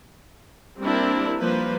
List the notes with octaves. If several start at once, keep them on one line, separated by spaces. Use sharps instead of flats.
G3 A#3 C4 D4 E4 A#4
F3 G3 A#3 B4 C5